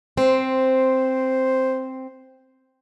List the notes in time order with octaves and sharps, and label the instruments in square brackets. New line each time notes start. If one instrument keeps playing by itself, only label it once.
[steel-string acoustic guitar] C4 [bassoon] C5